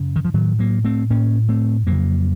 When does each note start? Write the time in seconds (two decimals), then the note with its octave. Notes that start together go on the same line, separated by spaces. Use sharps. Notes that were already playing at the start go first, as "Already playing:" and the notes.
Already playing: F#2 C#3
0.16 D#3
0.25 F3
0.34 A2 D#3 F#3
0.59 F#3 A#3
0.85 A3 C4
1.10 A2 A#3 C#4
1.49 A3 C4
1.87 F2 C#3 F#3 A#3